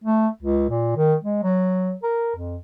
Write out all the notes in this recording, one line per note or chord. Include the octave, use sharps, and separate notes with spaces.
A3
C#2
A#2
D#3
G#3
F#3
A#4
F2